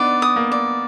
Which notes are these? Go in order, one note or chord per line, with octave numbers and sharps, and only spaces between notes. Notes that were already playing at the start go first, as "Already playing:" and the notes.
Already playing: B3 D4 D#4 D5
D#6
A#3
D5